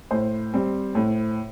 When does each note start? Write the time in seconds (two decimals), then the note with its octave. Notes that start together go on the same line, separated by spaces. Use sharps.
0.11 A2 C5
0.54 G3 C4
0.95 A2